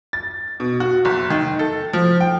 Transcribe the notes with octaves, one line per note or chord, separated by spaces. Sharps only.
A6
B2
F#4
F#1
D#3
A4
F3
G5